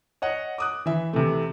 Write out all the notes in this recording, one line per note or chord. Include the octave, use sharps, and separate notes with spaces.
C#5 D#5 F#5
D6 D#6 F#6
E3 E5
C3 E3 A3